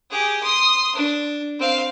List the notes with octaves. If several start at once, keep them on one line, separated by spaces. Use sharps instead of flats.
G4 G#4
C6 D#6
D4
C4 F5